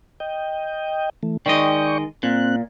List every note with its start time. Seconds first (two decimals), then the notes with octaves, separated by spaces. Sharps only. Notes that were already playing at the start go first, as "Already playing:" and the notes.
0.20 D#5 G5
1.23 E3 A3
1.46 D#3 G#3 D5 D#5 G5 C#6
2.23 A#2 C4 F#6